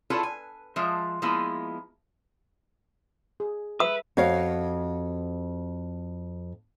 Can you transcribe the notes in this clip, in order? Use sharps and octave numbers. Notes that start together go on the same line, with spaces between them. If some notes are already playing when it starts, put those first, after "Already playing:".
E4 F4 G#4 A4 B4 C#5
G#5
F3 G#3 F4 E5
F3 G#3 A#3 B3 E4 F4
G#4
B4 E5 D#6
F2 F#4 C#5 F5